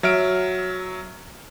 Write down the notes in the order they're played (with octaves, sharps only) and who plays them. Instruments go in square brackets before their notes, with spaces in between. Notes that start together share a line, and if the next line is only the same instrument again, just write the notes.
[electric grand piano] F#3 E5 F6 D7